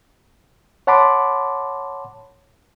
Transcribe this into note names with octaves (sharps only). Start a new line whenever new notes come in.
C#5 F#5 A5 B5 C6 D6